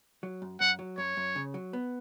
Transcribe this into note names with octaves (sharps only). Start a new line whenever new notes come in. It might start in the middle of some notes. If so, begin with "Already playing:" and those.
F#3
F#2
F#2 F#5
F#3
F#2 C#5
F#2
C#3
F#3
B3